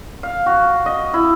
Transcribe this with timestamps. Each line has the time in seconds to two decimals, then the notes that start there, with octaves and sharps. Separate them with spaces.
0.23 F5
0.46 F#4
0.86 D#5
1.14 E4